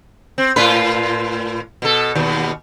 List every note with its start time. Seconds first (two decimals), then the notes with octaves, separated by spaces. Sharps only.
0.38 C4
0.56 A2 F4 B4
1.82 B2 A4
2.15 D#2 B2